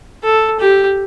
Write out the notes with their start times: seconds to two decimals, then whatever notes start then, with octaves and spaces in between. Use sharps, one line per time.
0.24 A4
0.60 G4